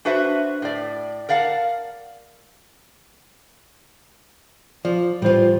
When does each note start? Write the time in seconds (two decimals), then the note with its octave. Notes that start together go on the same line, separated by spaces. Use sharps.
0.05 D4 F#4 B4 C5 E5
0.62 A2 D5
1.29 A#4 D5 F5 F#5 A5
4.85 F3 D5
5.22 A2 E3 G3 F4 C5